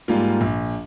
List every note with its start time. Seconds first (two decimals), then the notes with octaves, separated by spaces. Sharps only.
0.08 G#2 G3 A#3 F4
0.41 A#1